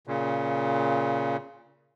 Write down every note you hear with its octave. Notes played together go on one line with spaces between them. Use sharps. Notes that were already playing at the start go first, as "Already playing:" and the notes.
A#2 C#3